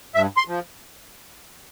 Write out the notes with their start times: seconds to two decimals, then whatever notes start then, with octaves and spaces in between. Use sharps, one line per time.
0.15 G2 E5
0.37 C6
0.48 F3